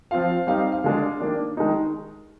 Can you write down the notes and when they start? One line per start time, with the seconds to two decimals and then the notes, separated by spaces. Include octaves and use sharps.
0.11 F3 C4 F4 F5
0.47 G3 C4 D#4 F5
0.72 F5
0.84 D3 G#3 D4
1.21 D#3 A#3 D4
1.57 D#3 G#3 D#4